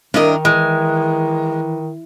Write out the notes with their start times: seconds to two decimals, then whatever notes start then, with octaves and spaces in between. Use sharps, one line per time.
0.14 G2 D#3 D4 E4 A#4 D#5
0.45 E3 G#3